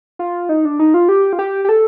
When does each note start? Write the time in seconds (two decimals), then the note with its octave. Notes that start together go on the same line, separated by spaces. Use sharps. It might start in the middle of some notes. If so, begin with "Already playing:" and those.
0.19 F4
0.49 D#4
0.65 D4
0.79 D#4
0.94 F4
1.09 G4
1.33 F4
1.39 G4
1.65 G4
1.69 A4